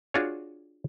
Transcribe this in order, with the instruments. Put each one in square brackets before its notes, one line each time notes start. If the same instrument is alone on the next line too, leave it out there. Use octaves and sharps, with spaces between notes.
[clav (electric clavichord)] D4 F4 F#4 G#4 C#5